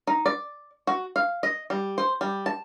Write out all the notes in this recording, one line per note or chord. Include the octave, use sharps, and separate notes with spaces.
D#4
D5
F#4
F5
D#5
G3
C5
G3
A5